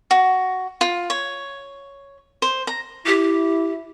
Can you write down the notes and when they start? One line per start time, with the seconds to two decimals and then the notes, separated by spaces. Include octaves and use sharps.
0.11 F#4
0.81 F4
1.10 C#5
2.42 C5
2.67 A#5
3.07 E4 G4